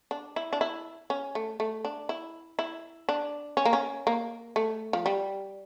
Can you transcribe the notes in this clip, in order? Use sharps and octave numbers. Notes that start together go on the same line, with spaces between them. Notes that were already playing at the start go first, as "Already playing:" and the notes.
D4
E4
D4
E4
C#4
A3
A3
D4
E4
E4
D4
C#4
A#3
C#4
A#3
A3
F3
G3